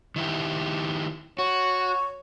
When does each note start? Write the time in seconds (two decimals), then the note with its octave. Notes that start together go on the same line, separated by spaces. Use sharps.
0.16 D#3 E4 G4
1.39 F#4 C#5